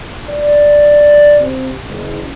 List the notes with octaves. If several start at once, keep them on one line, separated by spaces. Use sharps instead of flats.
D5
C3
F#1